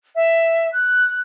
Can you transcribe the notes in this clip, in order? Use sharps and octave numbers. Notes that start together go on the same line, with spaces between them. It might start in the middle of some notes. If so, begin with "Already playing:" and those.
E5
F#6